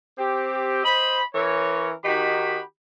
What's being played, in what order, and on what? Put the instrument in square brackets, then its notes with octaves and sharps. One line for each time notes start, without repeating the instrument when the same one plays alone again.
[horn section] C4 G4
C5 D#5 B5
E3 C#4 A#4 C#5
D#3 D#4 F#4 G4 B5